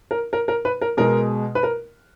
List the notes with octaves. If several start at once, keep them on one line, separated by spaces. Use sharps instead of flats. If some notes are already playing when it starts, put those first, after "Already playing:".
A#4
A#4
A#4
B4
A#4
B2 G#3 A#4
B4
A#4